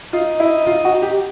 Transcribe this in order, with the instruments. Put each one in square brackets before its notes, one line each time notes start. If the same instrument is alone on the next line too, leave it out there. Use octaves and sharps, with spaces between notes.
[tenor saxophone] D#4 [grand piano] F4
[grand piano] E4
F4
F#4
G4